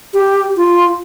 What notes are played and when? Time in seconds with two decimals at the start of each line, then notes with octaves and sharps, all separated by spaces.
0.14 G4
0.57 F4